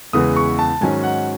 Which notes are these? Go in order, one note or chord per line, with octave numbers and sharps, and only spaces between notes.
E2 C#3 E3 G#3 B3 D#6
C#6
A5
G#2 D#3 F#3 C#4 G#5
F#5